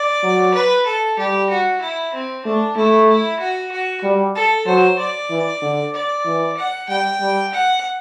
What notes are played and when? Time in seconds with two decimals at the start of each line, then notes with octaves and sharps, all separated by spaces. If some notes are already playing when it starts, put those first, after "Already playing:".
Already playing: D5
0.23 F#3
0.54 B4
0.86 A4
1.18 G3 G4
1.50 F#4
1.81 E4
2.14 C4
2.45 A3 D4
2.77 A3 E4
3.09 E4
3.40 F#4
3.72 F#4
4.04 G3
4.35 A4
4.67 F#3 C5
4.99 D5
5.31 E3
5.62 D3
5.94 D5
6.26 E3
6.57 F#5
6.89 G3 G5
7.21 G3
7.53 F#5